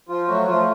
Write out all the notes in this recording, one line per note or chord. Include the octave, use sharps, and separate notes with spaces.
F3 F4
F#3 A3 F#4
F3 A3 F4